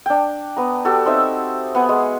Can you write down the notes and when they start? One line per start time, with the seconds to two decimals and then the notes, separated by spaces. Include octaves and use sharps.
0.06 D4 G5
0.56 B3 A#5
0.85 F#4 G4 A4
1.05 C4 D#4 E5
1.75 B3 F#5 G#5
1.89 G#3